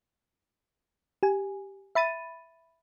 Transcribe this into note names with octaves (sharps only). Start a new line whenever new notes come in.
G4 G#5
E5 B5 A6 D#7